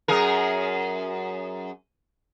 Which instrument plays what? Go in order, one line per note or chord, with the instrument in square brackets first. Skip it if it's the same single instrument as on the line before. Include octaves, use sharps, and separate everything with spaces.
[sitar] F#2 G#4 A#4